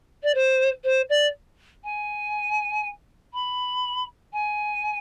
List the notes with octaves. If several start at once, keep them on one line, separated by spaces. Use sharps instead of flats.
D5
C5
C5
D5
G#5
B5
G#5